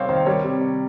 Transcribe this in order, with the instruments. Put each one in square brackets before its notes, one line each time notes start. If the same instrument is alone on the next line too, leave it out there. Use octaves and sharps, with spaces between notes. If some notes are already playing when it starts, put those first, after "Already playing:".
Already playing: [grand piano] C3 G3 C4 [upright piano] C#5 F5
[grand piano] D#3 [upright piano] C5
[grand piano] G3 [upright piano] A#4 C#5
[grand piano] C3
C3